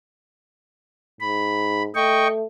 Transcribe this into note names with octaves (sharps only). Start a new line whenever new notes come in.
G#2 B5
A3 D#5 G5 C#6